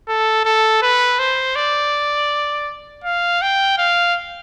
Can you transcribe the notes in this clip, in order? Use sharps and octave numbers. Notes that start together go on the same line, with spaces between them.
A4
A4
B4
C5
D5
F5
G5
F5